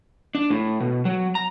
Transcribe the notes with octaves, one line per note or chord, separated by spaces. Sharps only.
D4
A2
B2
F#3
A#5